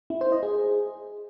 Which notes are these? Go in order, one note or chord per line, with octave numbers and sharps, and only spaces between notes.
E4
C5
D#5
G#4